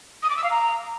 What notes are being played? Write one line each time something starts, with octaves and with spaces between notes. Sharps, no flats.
D#6
D6
E6
F5
A#5